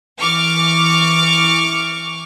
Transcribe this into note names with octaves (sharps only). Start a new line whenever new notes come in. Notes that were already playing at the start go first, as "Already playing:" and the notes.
E3 C#6 D6 F6